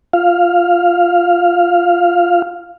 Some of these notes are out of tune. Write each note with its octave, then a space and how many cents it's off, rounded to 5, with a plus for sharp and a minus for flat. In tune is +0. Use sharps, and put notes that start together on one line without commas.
F4 +0 F5 +0